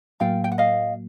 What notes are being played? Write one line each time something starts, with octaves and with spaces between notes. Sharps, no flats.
A2 F#3 A#3 F5 G5
G5
F#5
D#5 F5